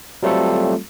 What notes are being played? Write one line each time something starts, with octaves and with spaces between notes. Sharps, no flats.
F#3 G3 A3 C4 F4 A4